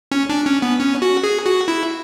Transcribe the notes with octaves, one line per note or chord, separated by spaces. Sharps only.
C#4
D4
C#4
B3
C#4
F#4
G#4
F#4
E4